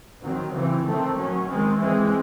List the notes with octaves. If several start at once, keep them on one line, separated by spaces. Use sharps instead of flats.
D#3 F#3 C4
C#3 E3 C4
D#3 A3 C4
D#3 F#3 C#4
D#3 G#3 C4
E3 G#3 C4